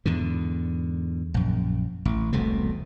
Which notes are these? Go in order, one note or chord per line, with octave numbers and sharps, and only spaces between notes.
E2 G#2 D3
A#1 F#2
A1
E1 C2 B2 A3